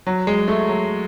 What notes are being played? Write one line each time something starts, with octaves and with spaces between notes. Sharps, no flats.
F#3
G#3
A3
F#3